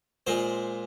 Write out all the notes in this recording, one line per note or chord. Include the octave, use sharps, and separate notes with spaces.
A#2 G#3 C5